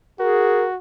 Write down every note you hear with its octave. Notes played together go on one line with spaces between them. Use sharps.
F#4 G#4 A#4